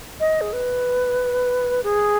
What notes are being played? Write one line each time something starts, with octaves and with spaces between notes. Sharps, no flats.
D#5
G#4
B4
G#4